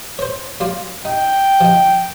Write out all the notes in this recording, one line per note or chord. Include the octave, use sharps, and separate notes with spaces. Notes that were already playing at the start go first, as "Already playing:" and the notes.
C5 C#5
F#3 F4 D5
D#4 G5
F3 D#4